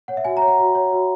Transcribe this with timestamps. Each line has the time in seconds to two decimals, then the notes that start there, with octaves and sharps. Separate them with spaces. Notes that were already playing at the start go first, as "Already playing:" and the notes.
0.08 C#5 F#5
0.17 E5
0.25 F#4 G#5
0.37 C#5 A#5
0.47 F#5
0.59 F#4
0.75 C#5
0.93 F#4